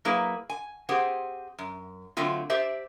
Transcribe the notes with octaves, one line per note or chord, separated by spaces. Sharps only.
F#3 A#3 E4 G#4 B4
G#5
C4 G4 G#4 C5 F#5
F#2
D3 F#3 A3 C4 F4
G4 C5 D5 E5